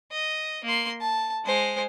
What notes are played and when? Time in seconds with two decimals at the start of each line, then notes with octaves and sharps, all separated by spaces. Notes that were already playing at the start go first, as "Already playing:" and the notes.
0.12 D#5
0.64 A#3 C6
1.01 A5
1.45 G#3 C5